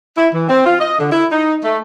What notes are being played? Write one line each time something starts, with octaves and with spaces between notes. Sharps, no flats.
E4
E3
C4
F4
D#5
D3
E4
D#4
A3